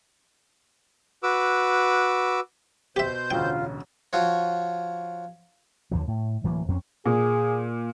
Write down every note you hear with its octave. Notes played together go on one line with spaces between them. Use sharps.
F#4 B4 D6 E6
B2 G4 C5 E5 G6
E1 A1 D2 F4 G5
F3 F4 F#4 C#5
D#2 D3 F3
A2
D1 E3 F#3 A#3
F2 C4 C#4
A#2 G#4